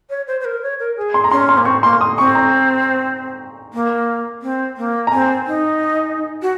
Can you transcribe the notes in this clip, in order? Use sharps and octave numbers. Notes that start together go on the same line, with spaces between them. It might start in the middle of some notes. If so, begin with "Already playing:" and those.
C#5
C5
C5
A#4
C#5
A#4
G#4
C6
A#5
C#4 C6
C6
A#3
C4 C#6
A#3 C6
D#6
C4 C#6
A#5
A#3
C4
A#3
A#5
C4 G#5
D#4
F#4